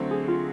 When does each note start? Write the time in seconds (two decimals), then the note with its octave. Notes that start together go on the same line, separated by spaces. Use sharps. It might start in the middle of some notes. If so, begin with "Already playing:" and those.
Already playing: D3 F#3 A3 C4
0.11 G#4
0.28 F4